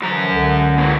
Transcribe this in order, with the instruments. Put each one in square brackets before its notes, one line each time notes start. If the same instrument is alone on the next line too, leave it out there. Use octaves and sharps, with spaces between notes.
[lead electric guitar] F#2 A#5 [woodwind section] D3 E3 F3
[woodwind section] C#2 D3
[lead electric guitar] C3 A#3